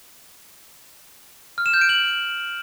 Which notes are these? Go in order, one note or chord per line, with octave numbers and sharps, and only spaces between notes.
F6
E7
G6
D7
F#7